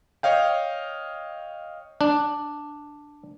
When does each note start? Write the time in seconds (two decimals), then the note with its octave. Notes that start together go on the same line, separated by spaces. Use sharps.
0.23 C#5 D#5 F5 G5
2.01 D4